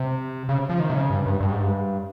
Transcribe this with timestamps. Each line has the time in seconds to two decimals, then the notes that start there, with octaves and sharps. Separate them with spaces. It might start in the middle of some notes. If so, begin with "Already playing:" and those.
Already playing: C3
0.49 C#3
0.69 F3
0.80 D#3
0.90 C3
0.95 C#3
1.10 G2
1.26 G2
1.41 G2
1.52 G#2
1.63 G2